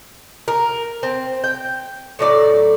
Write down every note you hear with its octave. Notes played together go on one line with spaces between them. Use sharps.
A#4
C4
G5
A2 F#3 D5